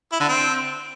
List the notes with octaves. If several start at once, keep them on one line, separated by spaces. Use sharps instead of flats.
E4
D3
C4